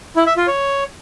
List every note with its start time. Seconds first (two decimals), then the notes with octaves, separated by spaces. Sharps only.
0.16 E4
0.27 E5
0.37 F4
0.47 C#5